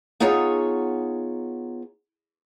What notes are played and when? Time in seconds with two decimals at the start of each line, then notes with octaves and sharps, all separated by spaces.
0.20 B3 D#4 F4 G#4 C#5 A#5